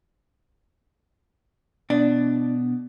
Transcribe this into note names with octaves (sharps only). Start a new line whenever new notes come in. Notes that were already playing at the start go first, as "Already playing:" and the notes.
B2 D4